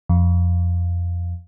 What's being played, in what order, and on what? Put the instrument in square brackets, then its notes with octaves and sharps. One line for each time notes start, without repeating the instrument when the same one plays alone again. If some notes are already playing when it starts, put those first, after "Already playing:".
[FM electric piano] F2